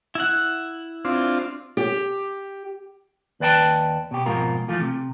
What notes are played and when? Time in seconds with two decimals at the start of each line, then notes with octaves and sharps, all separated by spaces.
0.15 E4 F#5
1.05 C4 D4 F4
1.77 G4
3.40 D#2 B4 D5 G5 A5
4.11 B2 G4
4.26 F2 G#2 B2 F4 A#4
4.68 E3 F3 A3 F4
4.80 C3